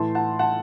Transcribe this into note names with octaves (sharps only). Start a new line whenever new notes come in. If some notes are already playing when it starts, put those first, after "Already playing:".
Already playing: A2 E3 A5 C6
F#5 A5
F#5 A5